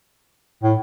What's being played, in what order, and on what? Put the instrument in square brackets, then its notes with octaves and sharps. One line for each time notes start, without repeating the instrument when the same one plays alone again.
[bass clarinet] A2